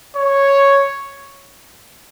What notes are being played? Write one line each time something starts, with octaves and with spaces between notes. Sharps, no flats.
C#5